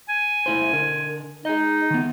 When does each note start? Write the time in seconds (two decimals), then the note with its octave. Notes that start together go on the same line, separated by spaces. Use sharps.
0.09 G#5
0.46 A3 E4 C5
0.73 D3 A#4
1.45 D#4 G#4 D#5
1.90 D#3 B3